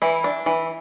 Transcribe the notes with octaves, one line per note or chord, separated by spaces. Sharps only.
E3 E4
D4
E3